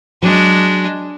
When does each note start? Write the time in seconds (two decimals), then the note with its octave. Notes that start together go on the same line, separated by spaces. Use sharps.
0.22 F#3 G#3 D4